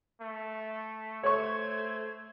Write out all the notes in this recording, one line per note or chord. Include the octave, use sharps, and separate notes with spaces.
A3
A3 C5 C#5 C#6 G#6